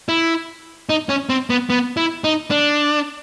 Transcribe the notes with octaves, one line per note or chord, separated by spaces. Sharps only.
E4
D#4
C#4
C4
B3
B3
E4
D#4
D4